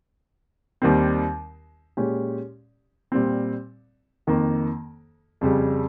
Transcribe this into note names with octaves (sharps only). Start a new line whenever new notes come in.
D#2 D#3 G3 C4
A#2 G#3 C#4 G4
A#2 G3 C4
F2 D#3 A#3
F2 C#3 G3